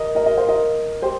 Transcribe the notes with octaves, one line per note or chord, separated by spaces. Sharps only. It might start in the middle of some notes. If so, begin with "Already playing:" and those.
Already playing: A#4 D#5
A#4 D#5
A#4 D#5
C5 F5
A#4 D#5
G4 C5